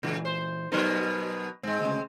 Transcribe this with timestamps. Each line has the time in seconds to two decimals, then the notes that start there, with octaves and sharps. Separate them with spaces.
0.03 A#2 C#3 E3
0.25 C5
0.72 B2 F#3 B3 D#4 A#4 C5
1.63 G#2 G#3 C4
1.81 D2 C#3